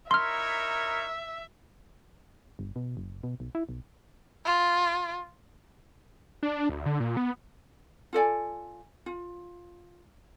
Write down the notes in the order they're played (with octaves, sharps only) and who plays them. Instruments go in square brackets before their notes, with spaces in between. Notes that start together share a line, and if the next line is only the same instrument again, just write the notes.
[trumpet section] D#4 E4 C#5 [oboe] A#4 [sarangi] E5 [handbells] C6 F6
[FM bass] G1
B2
F#1
B2
B1
E4
B1
[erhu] F4
[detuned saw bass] D4
D2
D3
A#2
B3
[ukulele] F4 A4 D5 G#5
F4